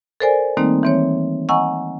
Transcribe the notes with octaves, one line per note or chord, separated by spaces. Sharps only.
A4 A#4 C5 D5 G#5
D#3 G3 A3 A#3 C4 D#4
E3 C4 C#5
D#5 F#5 G#5 A#5 C#6 E6